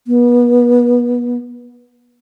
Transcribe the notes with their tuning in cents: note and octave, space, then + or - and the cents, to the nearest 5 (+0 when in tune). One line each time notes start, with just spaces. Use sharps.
B3 -30